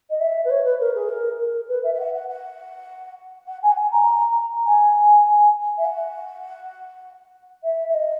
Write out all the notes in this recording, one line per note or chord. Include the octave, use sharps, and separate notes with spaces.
D#5
E5
B4
C#5
B4
A#4
G#4
A#4
A#4
B4
E5
E5
F#5
F#5
F#5
F#5
G#5
F#5
G#5
A#5
G#5
E5
F#5
E5
E5
D#5